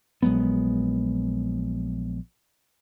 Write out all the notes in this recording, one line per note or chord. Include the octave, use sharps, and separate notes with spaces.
A#1 F#3 G#3 B3